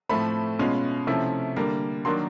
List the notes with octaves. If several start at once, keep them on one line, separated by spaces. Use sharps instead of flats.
A2 F3 A3 C4 B5
B2 G#3 C#4 F4
C3 F3 A3 C#4 E4
D3 G3 A#3
D#3 F#3 A#3 D4 C6